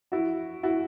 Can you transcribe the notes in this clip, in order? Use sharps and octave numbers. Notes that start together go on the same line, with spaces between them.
E4 F#4
E4 F#4